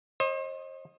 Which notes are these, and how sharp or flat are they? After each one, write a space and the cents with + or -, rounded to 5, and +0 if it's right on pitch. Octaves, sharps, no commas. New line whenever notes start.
C5 +40 D#5 +0